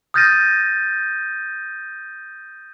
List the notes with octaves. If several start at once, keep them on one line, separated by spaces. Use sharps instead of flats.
D#6 F6 G6 A6 A#6 D#7